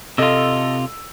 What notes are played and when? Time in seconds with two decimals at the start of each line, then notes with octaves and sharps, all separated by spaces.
0.18 C3 F4 A4 D#5 E6